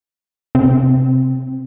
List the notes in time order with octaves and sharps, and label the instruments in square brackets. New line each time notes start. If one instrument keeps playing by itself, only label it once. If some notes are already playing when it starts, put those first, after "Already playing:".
[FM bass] C3 [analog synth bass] C4